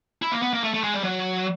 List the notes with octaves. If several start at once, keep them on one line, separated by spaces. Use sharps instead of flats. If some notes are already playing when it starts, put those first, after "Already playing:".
E4
A#3
B3
A#3
A3
A3
G#3
G3
F#3